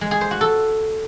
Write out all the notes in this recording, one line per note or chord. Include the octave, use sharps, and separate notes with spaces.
G#3
G#4
C5
F#4
A4